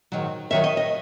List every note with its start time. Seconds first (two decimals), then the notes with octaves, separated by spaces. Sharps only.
0.12 G#2 D#3 F#3
0.50 F#2 D#3 F#3 E5
0.64 D#5
0.77 D#5